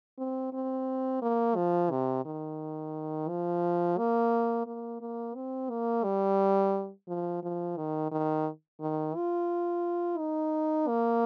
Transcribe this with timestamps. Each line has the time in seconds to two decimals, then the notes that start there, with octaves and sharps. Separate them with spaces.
0.19 C4
0.53 C4
1.22 A#3
1.56 F3
1.91 C3
2.25 D#3
3.29 F3
3.98 A#3
4.67 A#3
5.01 A#3
5.35 C4
5.70 A#3
6.04 G3
7.08 F3
7.43 F3
7.77 D#3
8.12 D#3
8.81 D#3
9.16 F4
10.18 D#4
10.88 A#3